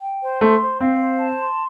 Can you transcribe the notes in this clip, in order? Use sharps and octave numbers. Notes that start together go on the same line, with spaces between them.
G5
C5
A3 C6
C5
C4 F5
C5
A5
C6